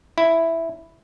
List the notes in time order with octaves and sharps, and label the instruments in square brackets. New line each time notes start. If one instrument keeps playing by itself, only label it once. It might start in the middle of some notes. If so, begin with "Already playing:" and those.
[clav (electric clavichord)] E4